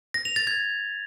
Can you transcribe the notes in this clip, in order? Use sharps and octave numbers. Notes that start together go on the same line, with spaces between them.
A#6
F7
A6
G#6